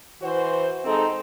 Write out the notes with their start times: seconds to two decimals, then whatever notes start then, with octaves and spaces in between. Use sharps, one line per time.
0.21 E3 F#4 C5
0.84 G#3 C4 D#4 A4